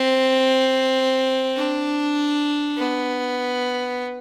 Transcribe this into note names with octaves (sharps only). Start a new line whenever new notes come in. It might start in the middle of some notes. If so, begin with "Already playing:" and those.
Already playing: C4
D4
B3